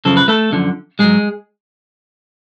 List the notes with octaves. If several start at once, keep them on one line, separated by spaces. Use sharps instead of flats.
F#2 C#3 F3 A4
B4
A3 A4
F#2 D3 F3
G#2 F#3 G#3 G#4